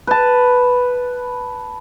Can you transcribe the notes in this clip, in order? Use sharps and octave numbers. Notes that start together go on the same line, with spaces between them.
B4 A5